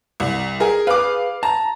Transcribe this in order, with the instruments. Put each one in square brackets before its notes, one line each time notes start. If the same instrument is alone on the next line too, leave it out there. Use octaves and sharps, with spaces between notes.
[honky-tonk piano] C2
G#4 A#4
[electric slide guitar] G#4 B4 [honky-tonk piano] F5 D6
[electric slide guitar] A5 [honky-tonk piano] A#5